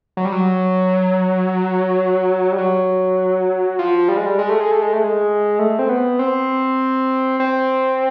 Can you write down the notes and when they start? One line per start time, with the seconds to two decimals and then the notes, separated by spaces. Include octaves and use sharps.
0.17 F#3
0.25 G3
0.32 F#3
2.52 G3
2.58 F#3
3.79 F3
4.08 G3
4.17 G#3
4.26 G3
4.39 G#3
4.49 A3
4.60 G#3
4.71 A3
4.82 G#3
4.93 A3
5.04 G#3
5.59 A3
5.79 C4
5.89 B3
6.19 C4
7.40 C4